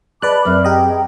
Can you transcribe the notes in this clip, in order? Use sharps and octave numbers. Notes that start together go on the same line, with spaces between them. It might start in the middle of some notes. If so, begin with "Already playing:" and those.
G#4 B4 D5 D#5 A5 B5 D6 F#6
F#2 C4 A#4 E5 F6
G4 G#4 D#5 G5 A#5